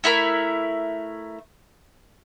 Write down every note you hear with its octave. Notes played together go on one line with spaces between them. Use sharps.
A3 E4 A#4 B5